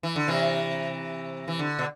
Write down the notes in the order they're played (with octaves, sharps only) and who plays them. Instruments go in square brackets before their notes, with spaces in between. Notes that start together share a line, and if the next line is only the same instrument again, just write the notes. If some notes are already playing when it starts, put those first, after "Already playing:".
[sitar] E3
D3
C3 E3
E3
D3
B2